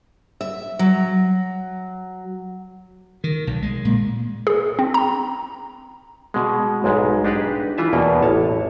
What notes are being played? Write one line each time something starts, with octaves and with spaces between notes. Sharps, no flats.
E5
F#3
D#3
B1
G#3
A#2
G#4
C4
A#5
B2 G#3
B1 G#2 G#3
D4 D#4 G4 G#4 B4
E3 F4 E5 A5
E2 B2 A#3 G5
A1 C#5 A5